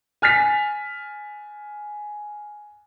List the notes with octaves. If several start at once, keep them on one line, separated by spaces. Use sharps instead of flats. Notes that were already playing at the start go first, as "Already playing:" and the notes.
G#5 F6 A6 B6